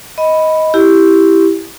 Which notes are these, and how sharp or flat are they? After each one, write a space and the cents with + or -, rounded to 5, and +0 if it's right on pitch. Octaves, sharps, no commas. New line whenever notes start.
D#5 +15 B5 +0
E4 +0 G4 +0